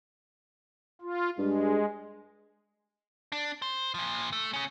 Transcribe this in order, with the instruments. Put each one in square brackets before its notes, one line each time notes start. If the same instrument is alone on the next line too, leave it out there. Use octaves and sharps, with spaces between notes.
[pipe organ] F4
[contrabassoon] G2 [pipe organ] G#3
[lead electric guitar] D4
C5
A#2 F3
A3
C#3 C#4